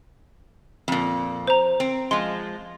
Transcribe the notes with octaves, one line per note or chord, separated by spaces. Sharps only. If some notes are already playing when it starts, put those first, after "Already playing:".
F2 A#2
C5 A#5
C4
F3 G#3 C6